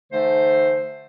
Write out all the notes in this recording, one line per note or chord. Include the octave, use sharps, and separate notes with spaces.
D3 E3 A3 D#4 C5